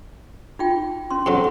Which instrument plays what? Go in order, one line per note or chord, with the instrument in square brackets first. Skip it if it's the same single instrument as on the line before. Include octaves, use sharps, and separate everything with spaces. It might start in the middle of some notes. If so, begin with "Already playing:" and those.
[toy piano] D#4 F4 G5
C#4 C6
[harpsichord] F2 G#2 F#3 [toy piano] G4